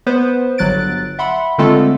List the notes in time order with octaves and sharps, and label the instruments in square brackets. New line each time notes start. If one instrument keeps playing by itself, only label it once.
[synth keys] B3 B4 C5
G1 F#3 F#6 A6 D7
E5 F#5 B5 C6
D3 G#3 A3 C4 F4 A4